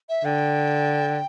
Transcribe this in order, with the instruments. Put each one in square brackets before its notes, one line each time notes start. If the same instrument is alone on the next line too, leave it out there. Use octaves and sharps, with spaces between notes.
[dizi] E5
[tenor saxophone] D3 [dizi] G5